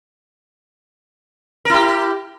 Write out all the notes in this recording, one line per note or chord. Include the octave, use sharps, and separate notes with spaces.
E4 G4 A#4